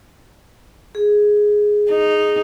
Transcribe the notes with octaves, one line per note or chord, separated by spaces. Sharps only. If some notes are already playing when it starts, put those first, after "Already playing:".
G#4
D#4